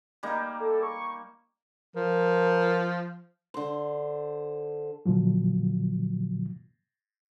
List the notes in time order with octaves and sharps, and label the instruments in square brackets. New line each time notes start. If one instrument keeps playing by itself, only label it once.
[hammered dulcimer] G3 A#3 D#4
[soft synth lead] A4
C#6
[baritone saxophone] F3 [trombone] A#4
[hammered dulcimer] D3 C5
[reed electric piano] A#2 D3 F3 F#3